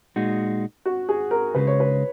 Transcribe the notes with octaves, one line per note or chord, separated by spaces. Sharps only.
A#2 G#3 D#4 F#4
F#4
G#4
A#4
C#2 C#3 G#3 B4
C#5
B4